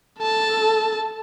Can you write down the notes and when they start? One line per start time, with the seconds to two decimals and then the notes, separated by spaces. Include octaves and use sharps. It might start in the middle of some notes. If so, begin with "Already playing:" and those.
0.19 A4 A5